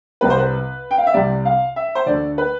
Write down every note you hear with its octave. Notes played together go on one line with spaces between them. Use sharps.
C2 C3 G3 B4
C5
B4
G5
F5
E5
C2 C3 G3 D5
F5
E5
C5
D2 D3 A3 D5
B4